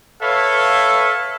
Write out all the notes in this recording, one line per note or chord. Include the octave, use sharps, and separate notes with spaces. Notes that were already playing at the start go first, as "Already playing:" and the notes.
A4 B4 C#5 E5 F5